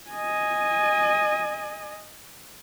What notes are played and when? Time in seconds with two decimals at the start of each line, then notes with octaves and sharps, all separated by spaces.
0.10 D#5 G#5